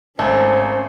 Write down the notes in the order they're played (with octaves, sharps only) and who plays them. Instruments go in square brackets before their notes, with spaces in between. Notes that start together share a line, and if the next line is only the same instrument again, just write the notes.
[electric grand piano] G#1 [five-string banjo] A3 [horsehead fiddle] C#4 C5 [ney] G#5